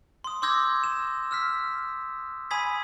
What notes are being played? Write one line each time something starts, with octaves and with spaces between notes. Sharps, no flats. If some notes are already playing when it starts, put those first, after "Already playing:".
C6 D#6
C6 D6 E6 G6 G#6 A#6
E7
E6 F6 B6
G#5 B5 D#6 G#6 B6